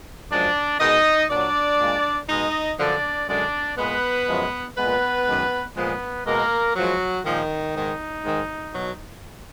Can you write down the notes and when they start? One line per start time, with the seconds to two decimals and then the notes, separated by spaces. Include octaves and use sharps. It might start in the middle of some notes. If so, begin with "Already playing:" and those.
0.31 F#2 F3 G#3 D4 D5
0.80 B2 G#3 D#4 D#5
1.30 A#2 F#3 D4 D5
1.79 A#2 G#3
2.29 B2 G#3 D#4 D#5
2.79 F#2 D3 F3 D4 D5
3.28 F#2 D3 G#3 D4 D5
3.78 A#2 G#3 B3 B4
4.28 F#2 F3 G#3
4.77 A#2 G#3 B3 B4
5.27 F#2 D#3 G#3
5.76 A#2 F3 G#3 B3 B4
6.26 B2 G#3 A#3 A#4
6.75 F#2 F3 F#3 G#3 F#4
7.25 A#2 D#3 F3 G#3 D#4
7.75 G#2 D#3 G#3
8.25 G#2 D#3 G#3
8.74 B2 F#3